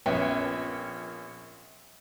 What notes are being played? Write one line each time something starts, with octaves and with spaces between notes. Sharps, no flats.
A#1 B3 C#4 C#5 E5 G5